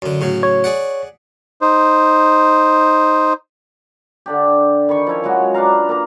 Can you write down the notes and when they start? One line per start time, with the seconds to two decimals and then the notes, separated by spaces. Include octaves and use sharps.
0.02 F#2 D3
0.21 A2 C#3 F#3
0.43 C#5
0.64 G#4 D5 F#5
1.61 D#4 C5
4.26 D3 D4 G4
4.89 D#3 B5 C#6
5.07 F3 C#4 E4 C#5
5.24 F3 F#3 G#3 F#4
5.54 D4 B4 F5 A#5
5.89 A#3 A#4 A#5